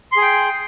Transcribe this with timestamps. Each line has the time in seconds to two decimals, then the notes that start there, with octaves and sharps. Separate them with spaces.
0.12 C6
0.17 G#4
0.22 G5